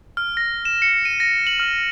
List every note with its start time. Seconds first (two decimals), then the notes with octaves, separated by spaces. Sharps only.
0.17 F6
0.37 A#6
0.65 E7
0.82 C#7
1.05 D#7
1.20 A#6
1.47 F#7
1.60 F6